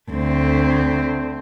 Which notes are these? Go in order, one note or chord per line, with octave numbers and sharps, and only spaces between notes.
D2 C4